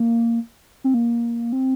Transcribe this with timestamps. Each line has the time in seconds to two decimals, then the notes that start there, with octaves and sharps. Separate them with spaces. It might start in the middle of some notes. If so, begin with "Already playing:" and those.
Already playing: A#3
0.84 C4
0.94 A#3
1.52 C4